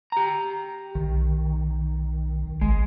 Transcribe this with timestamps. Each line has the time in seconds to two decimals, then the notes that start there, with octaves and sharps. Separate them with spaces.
0.12 G4 A#5
0.95 B1 D#3
2.61 G#1 G#3